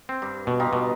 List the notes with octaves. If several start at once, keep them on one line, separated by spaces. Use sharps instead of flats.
C4
G2
B2
D#4 F4 G4
B2